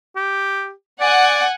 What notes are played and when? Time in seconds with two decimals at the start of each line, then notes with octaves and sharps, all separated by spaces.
0.16 G4
1.00 D5 F#5 G#5